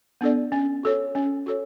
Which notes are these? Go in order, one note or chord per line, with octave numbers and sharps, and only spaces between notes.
B3 D4 A4 D5
C#4
F#4 A4 C#5
C#4
F#4 A4 C#5